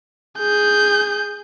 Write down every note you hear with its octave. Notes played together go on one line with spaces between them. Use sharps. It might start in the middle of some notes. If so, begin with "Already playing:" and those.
G#4 G6